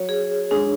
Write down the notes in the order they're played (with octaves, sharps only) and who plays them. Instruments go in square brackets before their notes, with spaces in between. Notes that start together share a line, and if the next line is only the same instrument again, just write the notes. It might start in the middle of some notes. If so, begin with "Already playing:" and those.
Already playing: [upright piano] F#3 [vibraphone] C#5
[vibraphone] G#4
[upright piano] G#3 [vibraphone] D4